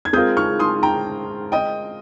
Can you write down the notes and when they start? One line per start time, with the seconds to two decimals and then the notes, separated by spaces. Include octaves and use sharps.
0.05 G#6
0.13 G#3 C4 F4 A#4 D#6 G6
0.37 C#6 F6
0.59 C6 D#6
0.83 G5 A#5
1.52 D#5 G5